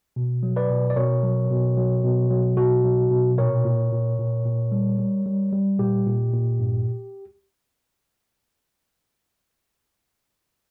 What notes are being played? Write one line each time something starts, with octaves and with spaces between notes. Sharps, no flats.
B2
F#3
B4 D5
B2
D5
B2 A#4 C#5
F#3
B2
F#3
B2
F#3
B2 F#4
F#3
B2
A#2 A#4 C#5
A#2
A#2
A#2
A#2
G3
G3
G3
G3
A#2 G4
A#2
A#2
G2